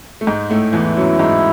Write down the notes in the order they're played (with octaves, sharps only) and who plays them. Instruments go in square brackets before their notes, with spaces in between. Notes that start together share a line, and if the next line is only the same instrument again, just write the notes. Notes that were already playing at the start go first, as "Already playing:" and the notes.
[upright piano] A3
G#2 G#3
A2 A3
[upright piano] E2 E3 [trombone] E4
[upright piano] F#2 F#3
G#2 G#3